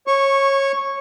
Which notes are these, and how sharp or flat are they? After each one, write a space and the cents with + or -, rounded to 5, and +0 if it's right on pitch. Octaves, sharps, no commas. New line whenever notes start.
C#5 -20 C#6 -5